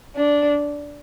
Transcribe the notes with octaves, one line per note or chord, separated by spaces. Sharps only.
D4